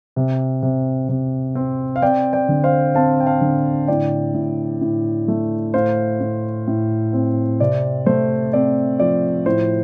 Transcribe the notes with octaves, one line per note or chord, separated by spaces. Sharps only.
C3
C3
C3
C4
F5
C4 D5 G5
D5 G5
D3
C5 F5
C4 F5 A5
G5
F5 A5
D3
A2 D5 G5
A2
A2
A3
A2 C5 F5
A2
A2
C4
C3 D5
A3 C5
C4 D5
F3 D5
A2 C5